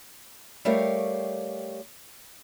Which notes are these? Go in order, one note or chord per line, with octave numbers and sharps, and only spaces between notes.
G3 A3 G4 A#4 C#5 F5